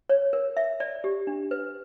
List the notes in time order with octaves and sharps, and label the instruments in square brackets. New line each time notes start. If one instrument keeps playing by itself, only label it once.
[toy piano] C#5
A#4
E5
D5
G4
D4
B4